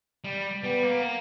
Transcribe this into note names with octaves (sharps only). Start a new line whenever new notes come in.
G3
G3 B3
A#3